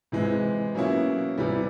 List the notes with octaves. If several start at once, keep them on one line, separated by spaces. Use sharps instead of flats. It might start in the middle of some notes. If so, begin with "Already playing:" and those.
C3 E3 G#3 C4
B2 F#3 A#3 C#4 E4
C3 E3 G3